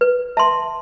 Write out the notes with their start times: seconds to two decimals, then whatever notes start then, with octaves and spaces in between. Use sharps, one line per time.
0.01 B4
0.37 E5 A5 C6